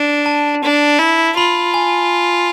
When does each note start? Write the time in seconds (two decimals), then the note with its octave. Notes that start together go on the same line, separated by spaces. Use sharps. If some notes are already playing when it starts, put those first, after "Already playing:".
Already playing: D4
0.26 A5
0.63 D4
0.99 E4
1.37 F4 B5
1.74 G#5